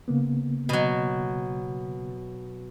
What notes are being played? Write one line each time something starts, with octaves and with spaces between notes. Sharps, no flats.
C#3 A#3 B3
B2 F#3